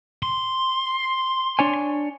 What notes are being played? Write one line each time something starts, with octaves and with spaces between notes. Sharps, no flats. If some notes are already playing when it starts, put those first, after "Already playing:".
C6
D4 C#5 G#5